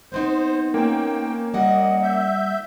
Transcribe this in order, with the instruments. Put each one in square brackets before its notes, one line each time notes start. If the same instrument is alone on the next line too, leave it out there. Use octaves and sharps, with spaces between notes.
[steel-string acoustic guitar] B3 C4 D#4 [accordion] C5
[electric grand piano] A#3 C#4 [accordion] G5
[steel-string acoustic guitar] G3 F#5 [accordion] D#5
[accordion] E5 G6